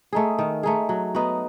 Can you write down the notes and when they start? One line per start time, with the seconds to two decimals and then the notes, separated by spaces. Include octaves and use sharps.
0.13 A3 D#4 G#4
0.39 D#3
0.63 A3 D#4 G#4
0.89 F#3
1.15 B3 D#4 F#4